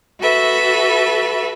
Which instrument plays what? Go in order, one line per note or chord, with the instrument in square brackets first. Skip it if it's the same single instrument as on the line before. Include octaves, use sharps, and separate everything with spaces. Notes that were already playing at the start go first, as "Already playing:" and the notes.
[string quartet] F#4 A4 B4 E5